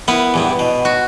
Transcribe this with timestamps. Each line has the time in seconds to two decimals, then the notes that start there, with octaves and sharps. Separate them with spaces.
0.08 B3 E4 A#4 B4
0.34 E2 G2 G3
0.59 B2
0.85 F#4